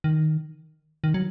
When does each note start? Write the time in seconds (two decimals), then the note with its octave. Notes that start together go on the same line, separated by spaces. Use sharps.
0.04 D#3
1.04 D#3
1.14 F#3